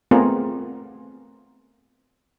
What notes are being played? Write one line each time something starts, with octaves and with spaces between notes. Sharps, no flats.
A3 B3 C4 F4 G#4 A#4